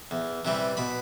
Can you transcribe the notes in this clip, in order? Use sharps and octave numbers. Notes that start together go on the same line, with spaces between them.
E2
C3 E3 G3
B2 B5